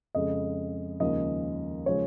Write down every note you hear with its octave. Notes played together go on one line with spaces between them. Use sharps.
F2 C#3 G#3 D#5
D#2 C#3 F3 G#3 D#5
C#3 F3 G#3 C#5